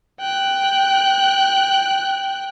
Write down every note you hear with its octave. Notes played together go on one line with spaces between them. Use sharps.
G5 F#6